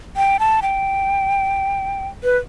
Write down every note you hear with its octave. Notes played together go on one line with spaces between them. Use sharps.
G5
A5
G5
B4